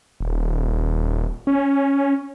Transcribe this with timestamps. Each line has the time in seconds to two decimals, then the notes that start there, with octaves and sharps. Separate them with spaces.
0.20 D#1
1.47 C#4